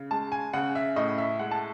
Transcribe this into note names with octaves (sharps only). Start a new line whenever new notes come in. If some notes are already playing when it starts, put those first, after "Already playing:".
Already playing: C#3
G#3 A5
G#5
C#3 F#5
E5
A2 D#5
E5
G#3 F#5
A5